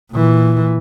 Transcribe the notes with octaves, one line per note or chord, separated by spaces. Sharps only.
A#2 E3